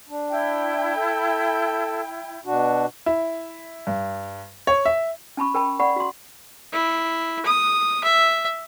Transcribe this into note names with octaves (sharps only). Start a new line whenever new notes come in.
D4
E4 G5
A4
B2 D4 F#4
E4
G2
C#5
E5
C#4 A5 B5 C#6
A#4 G5 A5 B5
D5 F#5 B5 C#6
F#4 C6
E4
D#6
E5